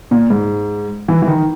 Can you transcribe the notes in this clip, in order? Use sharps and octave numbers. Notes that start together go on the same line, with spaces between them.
A#2
G#2
E3
E3
D#3